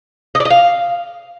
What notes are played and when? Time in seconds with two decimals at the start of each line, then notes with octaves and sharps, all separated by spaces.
0.35 D#5
0.40 D5
0.45 D#5
0.50 F5